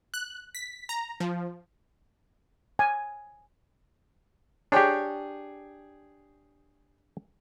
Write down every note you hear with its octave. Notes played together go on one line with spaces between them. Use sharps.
F#6
B6
A#5
F3
G#5
D4 G4 G#4 C#5 G5